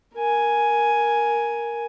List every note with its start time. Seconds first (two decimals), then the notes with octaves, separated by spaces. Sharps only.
0.15 A#4 G#5